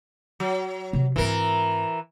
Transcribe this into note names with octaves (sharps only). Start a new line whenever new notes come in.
F#3
C3 F3
G#2 E3 C4 A#4